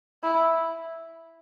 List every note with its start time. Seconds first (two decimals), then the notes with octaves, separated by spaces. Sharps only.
0.23 E4